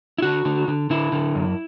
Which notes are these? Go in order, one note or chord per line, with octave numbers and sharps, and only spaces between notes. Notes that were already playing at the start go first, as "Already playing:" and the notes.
E4
D3 F#4
D3
D3
D3 E4
D3
F#2